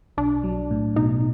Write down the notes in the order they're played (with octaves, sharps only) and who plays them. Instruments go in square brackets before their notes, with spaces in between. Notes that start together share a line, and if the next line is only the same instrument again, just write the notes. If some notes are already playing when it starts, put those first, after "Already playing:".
[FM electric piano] B1 [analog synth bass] D4
[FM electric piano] F#3
A2
[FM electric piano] B2 [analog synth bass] D#4